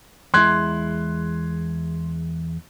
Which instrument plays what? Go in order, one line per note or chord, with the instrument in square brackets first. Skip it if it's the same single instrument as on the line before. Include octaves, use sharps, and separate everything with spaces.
[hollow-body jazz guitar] E2 G#3 E4 [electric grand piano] C6 F#6 G#6